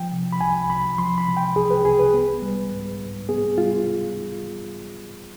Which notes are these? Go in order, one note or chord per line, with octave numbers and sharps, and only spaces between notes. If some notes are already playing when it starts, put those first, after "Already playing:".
Already playing: F3 G5
C3
B5
C2 G#5
C2 B5
F3 C6
B5
C3
G5
C2 G#4
B4
C2 G#4
B4
B3
G3
G#2
G#2
B3 G#4
G3 F4